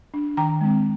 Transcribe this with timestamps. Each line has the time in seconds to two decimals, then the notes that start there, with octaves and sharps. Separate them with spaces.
0.14 D4
0.37 D#3 G5 A#5
0.61 G#3 C4